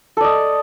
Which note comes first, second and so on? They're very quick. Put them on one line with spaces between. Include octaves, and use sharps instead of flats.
A4 D5 D#5